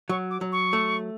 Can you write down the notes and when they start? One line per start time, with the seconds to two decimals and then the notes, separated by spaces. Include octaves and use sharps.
0.09 F#3 C#6
0.31 D6
0.41 F#3
0.52 C#6
0.73 A3